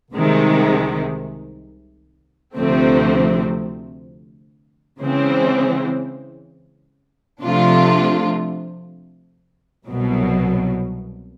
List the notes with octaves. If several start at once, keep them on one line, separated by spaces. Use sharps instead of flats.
C2 C3 D#3 G#3
D2 C3 F3 A3 C4
C#3 E3 G#3 C4
C3 F3 A3 D4 F4
C2 B2 F#3